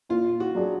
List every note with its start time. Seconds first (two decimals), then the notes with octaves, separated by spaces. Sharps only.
0.09 A#2 F4
0.40 F#4
0.55 F#3 D4 G#4